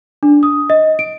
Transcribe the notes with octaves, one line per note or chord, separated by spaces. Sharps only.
D4
D#6
D#5
D7